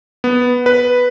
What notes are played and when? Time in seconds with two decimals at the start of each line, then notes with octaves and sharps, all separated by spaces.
0.24 B3
0.66 B4